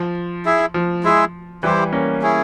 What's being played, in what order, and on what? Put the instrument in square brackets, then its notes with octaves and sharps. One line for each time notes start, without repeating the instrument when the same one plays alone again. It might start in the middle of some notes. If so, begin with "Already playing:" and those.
Already playing: [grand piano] F3
[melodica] E4 G#4 E5
[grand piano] F3
[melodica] G#3 E4 G#4 E5
[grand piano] E3 G3 [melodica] E4 G4 C5
[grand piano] A#3 C#4
[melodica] C#4 E4 G#4